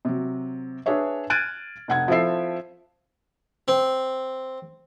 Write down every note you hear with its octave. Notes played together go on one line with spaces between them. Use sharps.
C3 F#3
D4 G#4 B4 C#5 E5
F6 F#6 G#6 A6 D7 D#7
F1 F#5 G#6
F3 C4 E4 A4 E5 C7
C4